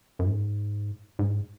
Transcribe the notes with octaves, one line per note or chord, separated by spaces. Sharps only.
F#2
G#2
G#2